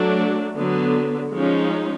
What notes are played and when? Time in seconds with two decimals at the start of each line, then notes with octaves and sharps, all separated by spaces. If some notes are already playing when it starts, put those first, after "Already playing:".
Already playing: F#3 A3 D4
0.57 D3 F#3 B3
1.31 F3 G#3 C#4 D#4